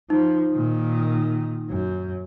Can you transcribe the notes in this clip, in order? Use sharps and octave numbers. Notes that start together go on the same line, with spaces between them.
F3 D#4
A#2 D#3
F#2